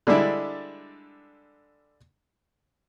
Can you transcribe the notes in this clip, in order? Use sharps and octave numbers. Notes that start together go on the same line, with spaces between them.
D3 G3 G#3 D4 E4